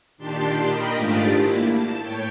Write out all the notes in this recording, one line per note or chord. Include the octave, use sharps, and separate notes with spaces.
A#2 D#3 D4 G4 A5 C6
A#4 D#5 G5 B5
G#2 A3 D4 F4 G4 A6
A#3 E4
A5
A2 C#5 G5